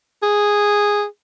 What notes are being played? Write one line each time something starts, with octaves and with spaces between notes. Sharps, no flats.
G#4